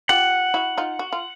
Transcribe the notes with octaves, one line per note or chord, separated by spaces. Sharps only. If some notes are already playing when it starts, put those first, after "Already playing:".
F4 G4 F#5
E4 F#4
D#4 F4
F#4
F4